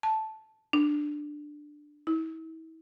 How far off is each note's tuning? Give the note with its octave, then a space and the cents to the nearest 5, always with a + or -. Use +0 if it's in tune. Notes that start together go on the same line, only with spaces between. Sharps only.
A5 -5
D4 +10
E4 -35